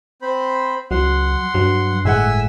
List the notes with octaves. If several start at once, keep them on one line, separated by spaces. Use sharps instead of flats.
C4 C5 B5
C#2 F#3 F#5 C6
G2 F#3
G1 A2 G#3 E5 F#5 G#5 E6